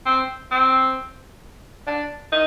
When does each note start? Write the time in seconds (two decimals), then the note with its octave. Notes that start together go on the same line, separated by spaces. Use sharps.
0.05 C4
0.51 C4
1.87 D4
2.32 D#4